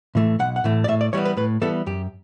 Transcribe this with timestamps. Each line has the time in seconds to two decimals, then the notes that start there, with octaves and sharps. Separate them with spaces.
0.15 A2 E3 A3
0.39 B1 F#5
0.56 F#5
0.64 A2 E3 A3
0.84 D5
0.88 A2 E5
1.01 D5
1.13 E3 G3 B3 C#5
1.25 B4
1.37 A2 B4
1.62 E3 G3 B3 A4
1.86 F#2 G4